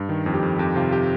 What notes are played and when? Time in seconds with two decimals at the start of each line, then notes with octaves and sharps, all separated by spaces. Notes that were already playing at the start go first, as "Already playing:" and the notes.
Already playing: G2
0.09 D#3
0.26 F2
0.34 G4
0.43 F2
0.59 F2 G4
0.76 C3 F4
0.92 G4